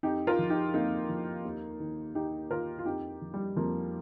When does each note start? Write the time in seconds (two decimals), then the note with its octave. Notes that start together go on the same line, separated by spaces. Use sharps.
0.03 F2 D#4 G4
0.27 F4 A#4
0.39 F3
0.50 D#4 G4
0.74 F2 A#3 D#4
1.09 F3
1.45 D#2
1.80 D#3
2.15 D#2 D#4 G4
2.51 D#3 F4 A#4
2.79 F4
2.85 F2 D#4 G4
3.22 F3
3.34 G3
3.56 F2 F3 A#3